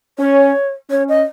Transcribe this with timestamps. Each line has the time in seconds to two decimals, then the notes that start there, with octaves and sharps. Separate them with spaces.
0.18 C#4 C#5
0.90 C#4 C#5
1.09 D#5